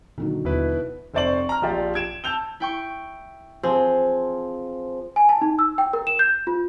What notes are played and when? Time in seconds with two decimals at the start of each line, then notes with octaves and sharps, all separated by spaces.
0.18 A#2 D3 D#3 F#3
0.45 D#2 B2 E4 B4
1.14 F1 C4 C5 D5 C#6 F#7
1.49 A#5 F6
1.62 A#1 F4 G4 D5
1.95 G#6 D7 E7
2.24 A5 E6 G6 F7 G7
2.60 E4 G5 C#6
3.63 F3 C4 G#4
5.16 G#5
5.29 A5
5.42 D#4
5.59 E6
5.78 G5
5.93 A#4
6.07 E7
6.19 G6
6.47 F4